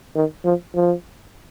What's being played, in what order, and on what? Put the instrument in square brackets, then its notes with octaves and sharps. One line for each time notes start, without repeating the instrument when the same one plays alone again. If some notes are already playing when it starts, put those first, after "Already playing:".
[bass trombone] D#3
F3
F3